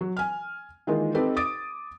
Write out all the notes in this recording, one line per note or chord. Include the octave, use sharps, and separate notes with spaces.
F#3
G#5 F6
D#3 E3 G#3 A#3 D#4 F4
C4 D#4 G4 A4 B4
D6 D#6 A6 D7